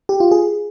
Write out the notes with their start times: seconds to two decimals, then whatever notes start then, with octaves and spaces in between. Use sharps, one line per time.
0.09 G4
0.20 F4
0.31 G#4